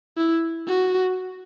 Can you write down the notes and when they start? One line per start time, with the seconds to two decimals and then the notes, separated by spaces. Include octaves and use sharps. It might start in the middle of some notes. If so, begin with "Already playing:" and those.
0.17 E4
0.68 F#4